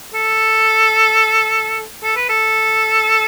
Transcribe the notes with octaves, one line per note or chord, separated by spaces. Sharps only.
A4
A4
B4
A4